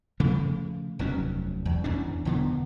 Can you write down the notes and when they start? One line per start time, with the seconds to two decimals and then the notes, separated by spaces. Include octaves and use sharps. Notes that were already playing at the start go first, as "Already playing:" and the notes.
0.20 C#3 F3 A3
0.99 F1 D#2 F#3 C#4
1.65 E2
1.84 E2 E3 C#4 D4
2.25 E1 D3 B3